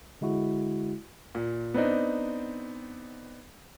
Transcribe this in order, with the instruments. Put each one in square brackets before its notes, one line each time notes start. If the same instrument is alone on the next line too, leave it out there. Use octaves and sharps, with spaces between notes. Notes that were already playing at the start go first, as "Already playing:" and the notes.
[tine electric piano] D3 G#3 E4 F#4
[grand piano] A#2
B3 C4 D4 D#4